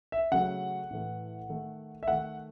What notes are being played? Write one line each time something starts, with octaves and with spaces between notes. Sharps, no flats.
E5
C#3 F#3 A3 F#5
A2 E3 A3
D#3 A3
E5
D#3 A3 F#5